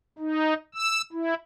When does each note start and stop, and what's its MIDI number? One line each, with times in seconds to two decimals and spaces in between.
0.19 0.54 63
0.74 1.01 88
1.13 1.34 64